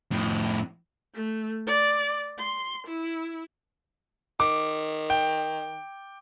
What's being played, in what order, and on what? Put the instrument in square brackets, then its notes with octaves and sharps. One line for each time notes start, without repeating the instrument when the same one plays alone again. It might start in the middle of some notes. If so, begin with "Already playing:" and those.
[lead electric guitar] F2 A2
[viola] A3
D5
C6
E4
[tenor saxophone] D#3 [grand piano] D6
[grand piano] G5